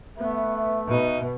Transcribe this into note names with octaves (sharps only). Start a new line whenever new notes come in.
A3 B3 E5
B2 D#4